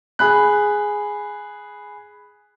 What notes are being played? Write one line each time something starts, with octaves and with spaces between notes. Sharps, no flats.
G#4 B5 F#6